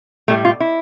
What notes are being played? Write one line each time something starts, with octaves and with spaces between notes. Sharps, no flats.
A2 G3 A3
F4
E4